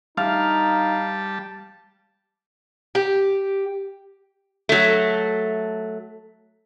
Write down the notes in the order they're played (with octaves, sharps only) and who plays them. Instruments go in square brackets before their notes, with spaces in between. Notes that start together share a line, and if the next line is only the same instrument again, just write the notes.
[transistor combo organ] G3 A5 [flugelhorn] D#4 [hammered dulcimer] F5
[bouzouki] G4
[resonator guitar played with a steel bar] F#3 A3